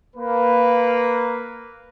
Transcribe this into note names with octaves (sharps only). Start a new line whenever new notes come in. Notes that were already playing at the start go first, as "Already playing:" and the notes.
A#3 B4